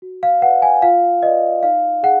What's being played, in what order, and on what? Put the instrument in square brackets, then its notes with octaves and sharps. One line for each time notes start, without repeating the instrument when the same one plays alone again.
[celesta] F#4
F5
B4 D5 F#5
G#5
F4 F5
B4 D5 D#5
D#4 F5
G#4 F#5